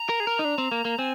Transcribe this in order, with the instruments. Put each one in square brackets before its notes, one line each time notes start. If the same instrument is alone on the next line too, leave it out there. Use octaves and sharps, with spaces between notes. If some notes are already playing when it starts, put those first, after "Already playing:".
Already playing: [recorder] A#5
[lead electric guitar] A#4
G#4
A#4
D#4
D4
C4
A#3
A#3
[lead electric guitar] C4 [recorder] G#5